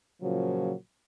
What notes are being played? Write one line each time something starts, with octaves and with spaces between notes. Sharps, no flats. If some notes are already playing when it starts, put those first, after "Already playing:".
A#2 C#3 F3 F#3